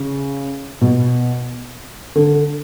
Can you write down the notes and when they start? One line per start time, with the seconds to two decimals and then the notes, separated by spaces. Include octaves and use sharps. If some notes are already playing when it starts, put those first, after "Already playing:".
Already playing: C#3
0.81 B2
2.15 D3